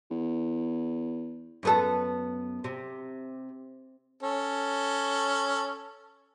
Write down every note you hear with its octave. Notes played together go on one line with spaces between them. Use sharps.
E2
F#2 B3 A4
C3
C#4 A4